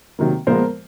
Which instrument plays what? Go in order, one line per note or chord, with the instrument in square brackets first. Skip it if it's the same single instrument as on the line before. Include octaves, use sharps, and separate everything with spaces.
[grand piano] C3 D#3 F#3 A#3
A#2 F3 G#3 B3 A#4 C5